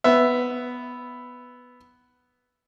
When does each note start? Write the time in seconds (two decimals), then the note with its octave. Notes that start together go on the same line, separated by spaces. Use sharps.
0.04 B3 E5